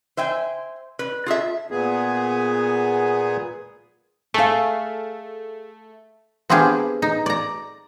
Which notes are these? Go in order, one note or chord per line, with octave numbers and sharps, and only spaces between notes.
C5 E5 G5 G#5
B4
F4 G#4 A4 E5
A#2 B3 G#4
A3 G#4 F5
B3 C4 D4 G4 G#4 F5
D#4
D5 A#5